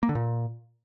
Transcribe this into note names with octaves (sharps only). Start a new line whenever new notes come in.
A#3
D3
A#2